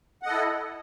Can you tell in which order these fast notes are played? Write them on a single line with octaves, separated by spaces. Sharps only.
F#5 D#5 A4 E4